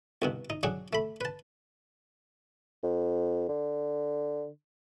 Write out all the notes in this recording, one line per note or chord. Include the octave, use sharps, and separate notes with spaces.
C2 G2 B2
D#4
F#3 D4 G#4 F#5
A3 B5
B4 A5
F2
D3